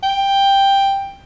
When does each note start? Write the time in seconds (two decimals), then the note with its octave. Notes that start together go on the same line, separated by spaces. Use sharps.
0.03 G5